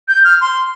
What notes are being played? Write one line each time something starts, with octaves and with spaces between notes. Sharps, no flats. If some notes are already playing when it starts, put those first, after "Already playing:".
G6
F6
C6